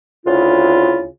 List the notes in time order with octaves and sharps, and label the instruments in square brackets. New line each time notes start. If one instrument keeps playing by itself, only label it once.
[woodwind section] D2 C#3 E4 F4